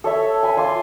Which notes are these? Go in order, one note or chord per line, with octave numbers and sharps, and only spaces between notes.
A4 C#5 E5
G#5 B5
F4 G#5 C6 D6